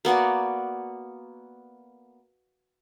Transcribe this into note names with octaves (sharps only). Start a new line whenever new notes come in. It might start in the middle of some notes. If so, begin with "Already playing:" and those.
A#3 B3 F#4 D5